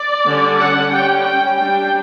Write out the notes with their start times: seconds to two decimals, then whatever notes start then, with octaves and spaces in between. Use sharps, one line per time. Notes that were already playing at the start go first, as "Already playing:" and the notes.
Already playing: D5
0.26 D3 G3 C#4
0.59 F#5
0.91 G3 C#4 G5
1.23 G5
1.56 G3 D4 G5